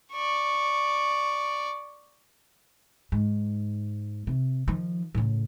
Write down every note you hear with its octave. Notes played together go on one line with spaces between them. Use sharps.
D5 C#6
G#2
C3
D#3 F3
A2 C#3